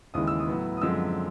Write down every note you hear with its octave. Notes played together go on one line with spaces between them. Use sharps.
D#2 C#3 E3 G#3 D#6
E6
D#6
A2 F#3 B3
D#6
F#2 D3 F3 G#3 C4 E6